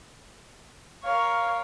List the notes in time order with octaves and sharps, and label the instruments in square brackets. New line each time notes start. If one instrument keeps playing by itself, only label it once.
[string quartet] A#4 C#5 [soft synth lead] F5